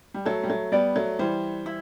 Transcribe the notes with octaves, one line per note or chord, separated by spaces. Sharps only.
G3
F#3 A3 A4
G3
F#3 A3
G3 B3 D5
F#3 A3
E3 G3 C5
E4